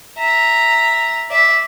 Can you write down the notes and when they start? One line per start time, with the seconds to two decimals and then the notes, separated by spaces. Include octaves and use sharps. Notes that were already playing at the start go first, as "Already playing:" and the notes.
0.18 E5 A#5
1.29 D5 E5